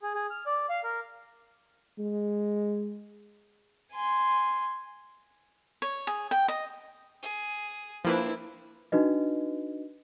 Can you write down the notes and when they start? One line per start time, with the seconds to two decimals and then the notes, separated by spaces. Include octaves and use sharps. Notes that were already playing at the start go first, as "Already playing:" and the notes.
0.02 G#4
0.14 G#4
0.30 F6
0.46 D5
0.69 F5
0.83 A#4
1.99 G#3
3.93 G#5 C6
5.82 C#5
6.07 G#4
6.31 G5
6.48 D#5
7.23 G#4
8.05 F3 A#3 C4 D4 E4 B4
8.92 D4 D#4 F#4 B4 D#5